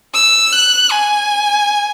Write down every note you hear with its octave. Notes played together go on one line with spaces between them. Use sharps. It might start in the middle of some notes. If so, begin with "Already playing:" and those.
E6
F#6
G#5